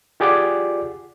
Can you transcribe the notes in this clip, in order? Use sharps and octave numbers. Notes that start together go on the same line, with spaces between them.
F4 G4 G#4 D5 F#5 D6